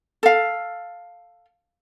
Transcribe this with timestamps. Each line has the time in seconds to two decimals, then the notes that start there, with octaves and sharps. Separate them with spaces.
0.23 A4 F5